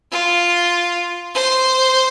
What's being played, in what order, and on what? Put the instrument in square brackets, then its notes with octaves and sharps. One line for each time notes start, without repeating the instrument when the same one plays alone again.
[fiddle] F4
C5